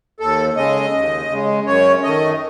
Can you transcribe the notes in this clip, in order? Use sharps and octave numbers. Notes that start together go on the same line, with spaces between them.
D#2 A4
C#3 G#3 D#5
D#2
C#3 G#3
F#2 C#5
D#3 A3 D#5